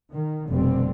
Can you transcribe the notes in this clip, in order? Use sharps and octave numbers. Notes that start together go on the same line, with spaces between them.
D#3
F1 B2 D3 G3 C4